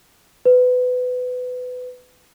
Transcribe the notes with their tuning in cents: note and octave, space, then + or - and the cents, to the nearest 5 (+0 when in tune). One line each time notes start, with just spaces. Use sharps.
B4 +25